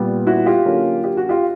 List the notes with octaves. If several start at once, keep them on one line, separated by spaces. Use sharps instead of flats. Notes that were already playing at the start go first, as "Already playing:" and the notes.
Already playing: A#2 G3 B3
E4 F#4
F4 G4
D3 F#3 A#3 C#4
G4
F#4
F4 G4